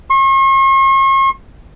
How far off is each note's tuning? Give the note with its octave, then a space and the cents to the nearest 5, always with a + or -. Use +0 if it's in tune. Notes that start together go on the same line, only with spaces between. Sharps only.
C#6 -45